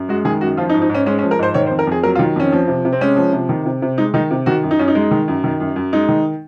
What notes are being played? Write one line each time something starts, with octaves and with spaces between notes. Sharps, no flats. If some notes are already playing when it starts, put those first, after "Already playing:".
Already playing: F#2
G#3 F#4
D#3 G#4
F#2 F#4
F3 F4
D#4
G#2
D#4
G#2 C#4
G#3 C#4
C#4
F3
A#4
G#2 C5
D#3 C#5
C5
F2
A#4
F2 G#4
F#3 A#4
F4
D#3
F2 C#4
F3
C3
C3
C4
G#3 C#4
F3
C3
D#3
C3
C3
G#3 D#4
D#3 D#4
C3
D#3 F#4
F#2
D#4
F#2 C#4
D#4
G#3
D#3
F#2
D#3
F#2
F#2
G#3 D#4
D#3